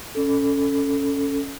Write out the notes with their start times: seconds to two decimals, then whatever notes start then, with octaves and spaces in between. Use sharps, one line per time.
0.15 C#4 A4